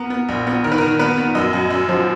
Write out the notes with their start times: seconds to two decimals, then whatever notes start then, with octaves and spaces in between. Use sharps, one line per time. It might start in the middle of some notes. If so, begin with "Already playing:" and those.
Already playing: B3 A#4
0.10 B3
0.29 A#1
0.47 B3
0.64 D#3 A#4
0.72 B4
0.78 D#3 A#4
0.99 B3 B4
1.17 B3
1.35 F#2 D#5
1.53 F#2
1.70 F#2
1.89 F3